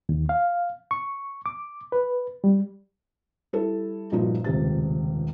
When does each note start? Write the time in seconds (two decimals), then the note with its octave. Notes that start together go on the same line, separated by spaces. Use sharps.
0.09 D#2
0.29 F5
0.91 C#6
1.46 D6
1.92 B4
2.44 G3
3.53 G3 E4 A4
4.12 G2 A#2 F3 A3 D#4 F#4
4.44 D#1 C#2 C3 A6